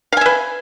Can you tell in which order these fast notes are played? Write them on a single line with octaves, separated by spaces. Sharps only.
F5 G#5 E5 B4